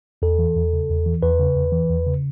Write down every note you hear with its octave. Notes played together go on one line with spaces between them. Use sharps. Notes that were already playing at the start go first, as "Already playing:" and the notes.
E2 A4
E3
E2
C#3
E2
E3
E2 B4
C#3
E2
E3
E2
C#3